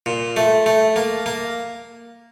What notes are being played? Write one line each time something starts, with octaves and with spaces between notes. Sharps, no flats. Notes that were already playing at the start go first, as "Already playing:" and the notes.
A#2
A3
A3
A#3
A#3